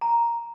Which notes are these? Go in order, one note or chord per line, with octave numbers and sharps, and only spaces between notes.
A#5